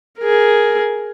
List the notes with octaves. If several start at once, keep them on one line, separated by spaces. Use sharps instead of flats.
G#4 A#4